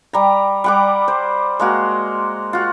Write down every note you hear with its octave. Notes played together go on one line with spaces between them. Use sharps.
G3 A#5
G3 F#5 D6
C5
G#3 A#3 F#4
F4 F#4